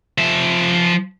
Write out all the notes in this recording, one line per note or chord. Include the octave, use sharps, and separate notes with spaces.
F3 E5